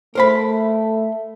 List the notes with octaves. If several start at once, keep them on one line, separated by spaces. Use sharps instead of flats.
A3 A#4 C5 B5